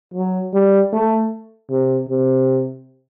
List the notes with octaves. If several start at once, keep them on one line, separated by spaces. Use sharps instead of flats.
F#3
G3
A3
C3
C3